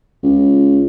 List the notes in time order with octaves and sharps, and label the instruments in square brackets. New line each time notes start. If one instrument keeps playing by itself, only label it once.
[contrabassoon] C#2